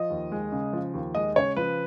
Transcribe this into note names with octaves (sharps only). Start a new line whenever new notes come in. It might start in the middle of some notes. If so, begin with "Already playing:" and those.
Already playing: F3 D#5
D#2
G#3
C#3
F3
D#2
G#3 D#5
C#3 C#5
F3 B4